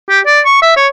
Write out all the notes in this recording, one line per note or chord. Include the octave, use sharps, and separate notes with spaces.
G4
D5
C#6
E5
C#5